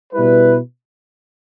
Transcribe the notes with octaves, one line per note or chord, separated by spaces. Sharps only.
B2 G3 E4 B4